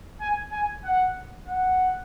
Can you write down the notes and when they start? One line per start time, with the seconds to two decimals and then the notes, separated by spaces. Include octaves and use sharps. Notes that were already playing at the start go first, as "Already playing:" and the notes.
0.20 G#5
0.52 G#5
0.84 F#5
1.48 F#5